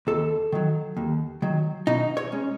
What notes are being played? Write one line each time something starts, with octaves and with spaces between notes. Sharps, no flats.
D#2 A4
D#3 F#3
D#2
D#3 F#3
B2 D#4
C#5
G#3 C#4